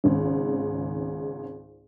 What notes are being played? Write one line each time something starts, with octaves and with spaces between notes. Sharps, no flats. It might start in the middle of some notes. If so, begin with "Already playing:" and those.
G#1 C#2 G#2